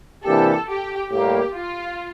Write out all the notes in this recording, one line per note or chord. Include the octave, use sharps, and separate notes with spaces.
C3 E3 A#3 D4 G4 A4
G4
A2 G3 A#3 G4
F4